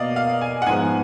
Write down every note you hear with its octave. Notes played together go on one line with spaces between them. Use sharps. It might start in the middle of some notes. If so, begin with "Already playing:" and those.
Already playing: B2 A#3 D5 D#5 F5
F5
G#5
F#5
G#2 F3 G#3 B3 G#5